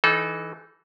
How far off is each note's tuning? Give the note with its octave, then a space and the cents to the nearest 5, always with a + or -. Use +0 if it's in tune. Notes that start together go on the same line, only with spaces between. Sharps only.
E3 +0 D#4 +0 A4 -30